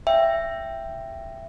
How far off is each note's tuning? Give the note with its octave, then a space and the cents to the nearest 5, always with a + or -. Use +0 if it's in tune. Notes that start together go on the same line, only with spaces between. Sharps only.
E5 +15 G5 +0